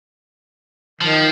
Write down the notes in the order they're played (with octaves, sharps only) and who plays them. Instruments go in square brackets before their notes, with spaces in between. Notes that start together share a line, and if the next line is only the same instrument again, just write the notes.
[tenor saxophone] D#3 [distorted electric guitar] F3